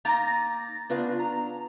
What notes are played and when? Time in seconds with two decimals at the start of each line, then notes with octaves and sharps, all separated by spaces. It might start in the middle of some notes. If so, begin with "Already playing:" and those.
0.05 A#3 D#4 A#5 A6 A#6
0.89 C#3 B3 D4 F4 B4 F5
1.19 A#5